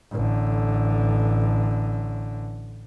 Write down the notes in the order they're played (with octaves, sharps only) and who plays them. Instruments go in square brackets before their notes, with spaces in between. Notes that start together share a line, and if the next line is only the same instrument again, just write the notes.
[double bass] A1 D3